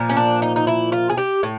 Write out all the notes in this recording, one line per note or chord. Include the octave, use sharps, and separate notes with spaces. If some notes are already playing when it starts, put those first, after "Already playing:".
Already playing: A#2 F3
C#4
D4
D#4
D#4
E4
F4
G#4
G4
A2